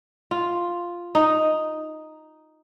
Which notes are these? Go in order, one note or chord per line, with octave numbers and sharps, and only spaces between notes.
F4
D#4